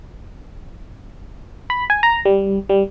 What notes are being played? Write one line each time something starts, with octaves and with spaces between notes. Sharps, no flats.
B5
G#5
A#5
G3
G3